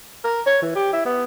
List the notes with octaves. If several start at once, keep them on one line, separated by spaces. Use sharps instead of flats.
A#4
C#5
E3
G4
E4
B3